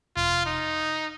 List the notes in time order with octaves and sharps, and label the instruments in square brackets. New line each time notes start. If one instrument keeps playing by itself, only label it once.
[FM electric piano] G1 F2 C3 [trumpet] F4
[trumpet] D#4